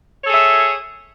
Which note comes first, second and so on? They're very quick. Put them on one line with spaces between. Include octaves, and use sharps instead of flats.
C#5 A4 G#4 E5